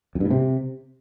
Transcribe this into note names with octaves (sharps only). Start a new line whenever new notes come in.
F2
G2
A2
C3